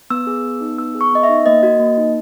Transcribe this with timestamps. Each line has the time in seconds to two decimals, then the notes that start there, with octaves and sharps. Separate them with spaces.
0.10 B3 E6
0.27 G#4
0.44 B3
0.61 D#4
0.78 B3 E6
0.95 G#4
1.01 C#6
1.12 B3 D#5
1.23 E5
1.29 D#4
1.46 A#3 D#5
1.63 F#4
1.80 A#3
1.97 D#4